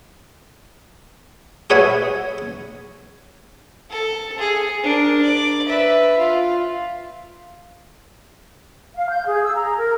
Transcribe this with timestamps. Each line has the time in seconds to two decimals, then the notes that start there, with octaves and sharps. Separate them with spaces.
1.70 G#4 B4 C#5 E5 F#5 G#5
3.91 A4
4.39 G#4
4.83 D4 A#4
5.22 D5
5.69 B4 E5
6.18 F4
8.95 F5
9.10 G6
9.26 G#4
9.43 E6
9.54 A#5
9.78 A#4